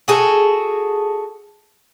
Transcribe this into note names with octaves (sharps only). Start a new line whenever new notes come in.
F#4 G#4 A4